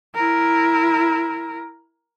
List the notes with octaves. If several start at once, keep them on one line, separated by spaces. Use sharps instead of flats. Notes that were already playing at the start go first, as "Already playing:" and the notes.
E4 A#4